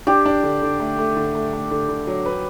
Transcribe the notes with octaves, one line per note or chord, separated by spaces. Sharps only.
D4 G4
D4
D3
D3
A3
A3
D3
A3
A3
D3
D3
F#3
B4